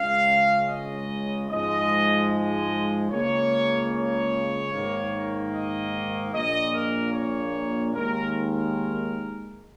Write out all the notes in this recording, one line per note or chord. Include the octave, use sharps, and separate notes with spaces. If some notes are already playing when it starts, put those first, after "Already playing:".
Already playing: C#2 C#3 G#3 F5
D#5
G#2 F3 G#3 D#5
D#5
C#2 C#3 A#3 C#5
C#5
G#2 D#3 A#3
D#5
A#1 A#2 A#3 D#5
A#4
C#5
D#2 D#3 G#3 A#4
A#4